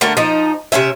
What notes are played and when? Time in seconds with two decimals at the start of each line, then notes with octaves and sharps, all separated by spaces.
0.01 D3 A3 F#4 A#4
0.17 F3 D#4
0.72 C3 B3 C#4 E5